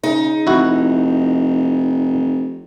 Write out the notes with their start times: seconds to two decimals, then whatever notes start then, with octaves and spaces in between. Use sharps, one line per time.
0.03 C#3 D#4
0.47 F1 E4 F#4